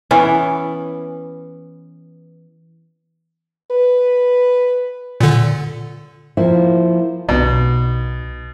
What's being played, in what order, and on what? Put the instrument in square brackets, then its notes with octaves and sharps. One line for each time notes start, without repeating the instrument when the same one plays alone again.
[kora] E3 B3 C#4
[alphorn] B4
[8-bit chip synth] A#2 D3
[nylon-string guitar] F3 A#3 E4 F4
[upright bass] B1 [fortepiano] B2